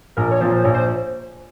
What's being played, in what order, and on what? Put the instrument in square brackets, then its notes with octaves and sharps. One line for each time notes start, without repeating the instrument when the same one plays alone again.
[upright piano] A#1 [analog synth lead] A#4
[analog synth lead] C#5
[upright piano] A#2 F3 [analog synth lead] C5
[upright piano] A#1 [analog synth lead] C#5
[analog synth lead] C5